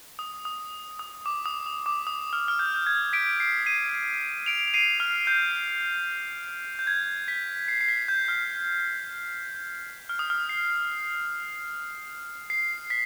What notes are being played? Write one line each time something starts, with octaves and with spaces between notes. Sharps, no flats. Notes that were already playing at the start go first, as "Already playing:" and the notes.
D#6
D#6
D#6
D6
D#6
D#6
D6
D#6
F6
F6
G6
G6
G#6
B6 D7
C7
C7 D#7
D7 F7
F7
C7 D#7
F6
G6
G6
G#6
B6
C7
C7
B6
G6
F6
F6
D#6
F6
C7
C7
B6